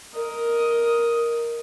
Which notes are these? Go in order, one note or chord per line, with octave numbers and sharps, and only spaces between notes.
A#4 D#5